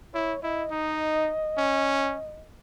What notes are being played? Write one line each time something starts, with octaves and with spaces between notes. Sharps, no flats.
E4 C#5
E4 D#5
D#4
C#4